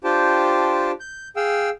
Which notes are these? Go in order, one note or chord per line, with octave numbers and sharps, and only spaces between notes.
D4 F4 G4 C5 G5 A5
G6
G#4 F5 G5 E6